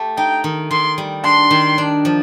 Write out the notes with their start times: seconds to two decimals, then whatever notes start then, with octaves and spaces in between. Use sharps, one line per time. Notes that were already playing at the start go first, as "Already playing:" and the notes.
Already playing: A3 G4
0.17 D#4 G5
0.44 D#3
0.71 D#3 C6
0.98 G3
1.24 D4 C6
1.51 D#3
1.78 D4
2.05 F3